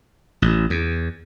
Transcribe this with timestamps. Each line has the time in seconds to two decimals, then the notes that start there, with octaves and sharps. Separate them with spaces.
0.42 A1
0.70 E2